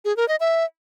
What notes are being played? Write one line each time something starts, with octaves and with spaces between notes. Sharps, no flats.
G#4
A#4
D#5
E5